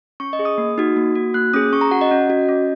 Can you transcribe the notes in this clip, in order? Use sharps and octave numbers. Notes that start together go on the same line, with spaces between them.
C#4 C#6
D#5
G#4
D#6
A#3
D#4 F#4
A#3
F#4
A#3 F#6
C#4 G#4 D#6
C#4 C#6
A#5
F#4 F#5
D#5
C#4
F#4
C#4